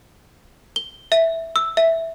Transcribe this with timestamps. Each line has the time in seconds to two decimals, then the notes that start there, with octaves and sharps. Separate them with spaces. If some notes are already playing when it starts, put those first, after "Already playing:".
0.76 G7
1.12 E5
1.56 E6
1.77 E5